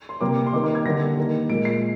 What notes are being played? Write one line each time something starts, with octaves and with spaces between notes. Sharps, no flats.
C6
C3 G3 A#3 D6
C6
D#3 A#3 D6
D6
G#6
D3 G3 A#3 A#6
D#3 A#3
A#2 G#3 D7
C7